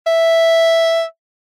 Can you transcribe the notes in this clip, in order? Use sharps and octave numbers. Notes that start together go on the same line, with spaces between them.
E5